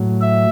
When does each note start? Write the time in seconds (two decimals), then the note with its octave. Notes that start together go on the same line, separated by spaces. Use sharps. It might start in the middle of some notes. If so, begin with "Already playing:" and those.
Already playing: A2 F#3
0.21 E5